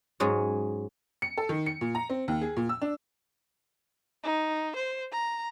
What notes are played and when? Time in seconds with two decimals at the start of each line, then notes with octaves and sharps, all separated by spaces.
0.20 G#2 F#3 G#3 C#4
1.22 C#7
1.38 A4
1.49 D#3
1.66 C#7
1.81 A#2
1.95 A#5
2.10 C4
2.28 D#2
2.41 G#4
2.57 A#2
2.69 E6
2.81 D4
4.24 D#4
4.76 C5
5.12 A#5